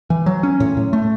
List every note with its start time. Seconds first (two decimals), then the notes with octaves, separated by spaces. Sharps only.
0.10 E3
0.26 F#3
0.43 C#4
0.60 A2
0.77 A2
0.93 A3